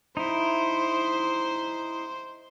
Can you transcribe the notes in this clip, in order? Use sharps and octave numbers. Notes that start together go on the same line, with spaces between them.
D#4 E4 C5